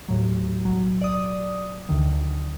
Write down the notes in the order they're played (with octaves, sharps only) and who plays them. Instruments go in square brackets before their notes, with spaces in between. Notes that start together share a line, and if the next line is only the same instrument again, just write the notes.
[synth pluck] D#2 A2 F#3
B1 F#3
D5 D#6
D2 D3 D#3